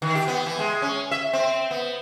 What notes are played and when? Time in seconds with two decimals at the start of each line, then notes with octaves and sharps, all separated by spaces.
0.02 D#3
0.15 G4
0.28 B3
0.46 E3
0.59 G#3
0.82 C#4
1.11 E5
1.33 C4
1.71 B3